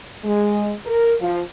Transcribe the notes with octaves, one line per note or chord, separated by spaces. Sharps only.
G#3
A#4
F3